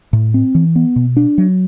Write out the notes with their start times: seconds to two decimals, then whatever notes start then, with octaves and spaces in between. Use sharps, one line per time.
0.13 A2
0.34 C4
0.55 E3
0.76 B3
0.96 B2
1.17 D4
1.38 F#3